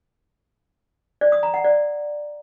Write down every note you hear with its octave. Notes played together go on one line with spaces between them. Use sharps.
D5
D#6
A#5
F#5
D5